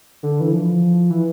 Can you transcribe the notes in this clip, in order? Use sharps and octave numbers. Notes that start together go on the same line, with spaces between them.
D3
E3
F3
E3